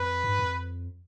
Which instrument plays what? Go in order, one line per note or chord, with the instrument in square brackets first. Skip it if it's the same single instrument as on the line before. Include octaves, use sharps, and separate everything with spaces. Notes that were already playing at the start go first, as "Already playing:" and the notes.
Already playing: [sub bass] F2 [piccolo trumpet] B4
[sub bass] G2
F2